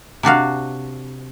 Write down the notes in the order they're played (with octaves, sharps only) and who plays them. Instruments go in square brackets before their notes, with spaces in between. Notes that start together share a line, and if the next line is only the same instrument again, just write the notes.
[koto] C3 D4 F#4 F5